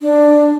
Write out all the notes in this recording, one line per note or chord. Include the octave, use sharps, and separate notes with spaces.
D4